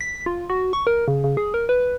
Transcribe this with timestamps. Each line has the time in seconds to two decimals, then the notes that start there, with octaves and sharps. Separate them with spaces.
0.01 B6
0.26 F4
0.50 F#4
0.73 C#6
0.87 A#4
1.08 C#3
1.24 C#3
1.37 G#4
1.54 A#4
1.69 B4